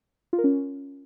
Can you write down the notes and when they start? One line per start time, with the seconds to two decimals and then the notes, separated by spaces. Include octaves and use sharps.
0.33 F4
0.38 A#4
0.44 C#4